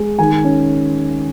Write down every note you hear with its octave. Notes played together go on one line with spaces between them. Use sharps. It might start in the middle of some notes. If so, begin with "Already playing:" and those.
Already playing: G#3
D#3 G#5
C#4